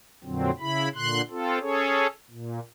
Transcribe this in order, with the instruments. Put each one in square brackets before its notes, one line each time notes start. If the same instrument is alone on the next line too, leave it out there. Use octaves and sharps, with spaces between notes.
[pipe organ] F2 A#2 D3 F#3 C4
C#3 E4 B5
A#2 D3 C6 F#6
C4 F4 A4
C#4 G#4 A4 C#5
A#2